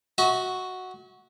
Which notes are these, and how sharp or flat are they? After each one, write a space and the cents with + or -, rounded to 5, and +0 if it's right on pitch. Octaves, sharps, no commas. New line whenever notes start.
F#4 +0 E5 -45